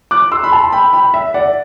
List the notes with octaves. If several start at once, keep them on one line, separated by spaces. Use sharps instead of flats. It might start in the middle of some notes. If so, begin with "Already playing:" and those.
D6 F#6
C6 E6
B5
A5 C6
G5 B5
G5 B5
E5
D5 F#5